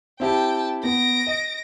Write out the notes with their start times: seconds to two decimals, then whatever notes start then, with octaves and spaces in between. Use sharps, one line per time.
0.20 C4 E4 G4 G5 A5
0.84 B3 A#6 D7
1.27 D#5